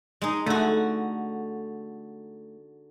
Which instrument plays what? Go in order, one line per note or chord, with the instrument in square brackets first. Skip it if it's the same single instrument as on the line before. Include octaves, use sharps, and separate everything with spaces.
[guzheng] G#3 D#4
[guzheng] D3 F#4 [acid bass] A3